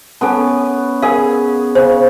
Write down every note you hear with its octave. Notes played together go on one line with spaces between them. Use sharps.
B3 C#4 A4 A5
G#4 A#4 F5
C#3 C5